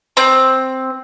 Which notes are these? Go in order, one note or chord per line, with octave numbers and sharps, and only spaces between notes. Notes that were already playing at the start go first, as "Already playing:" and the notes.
C4